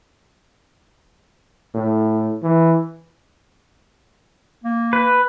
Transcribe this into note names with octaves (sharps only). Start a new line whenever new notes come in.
A2
E3
A#3
B4